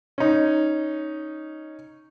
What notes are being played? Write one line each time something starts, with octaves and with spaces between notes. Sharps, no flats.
C#4 D#4